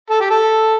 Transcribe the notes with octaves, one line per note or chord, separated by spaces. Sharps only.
A4
G4
A4